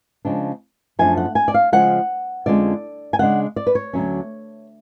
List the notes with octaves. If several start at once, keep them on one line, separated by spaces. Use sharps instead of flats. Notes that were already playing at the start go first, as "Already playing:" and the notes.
C#3 F3 G#3 D4
F#2 F3 A3 D4 G#5
F#5
G#5
D5
F5
C#3 F3 G#3 C#4 F#5
F2 D3 F3 G#3 C#4 D5
G#5
C#3 G#3 D4 F#5
D5
B4
C#5
D2 D3 F#3 C#4